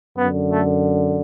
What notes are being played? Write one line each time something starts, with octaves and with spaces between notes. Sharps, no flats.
F#2 D3 B3
A3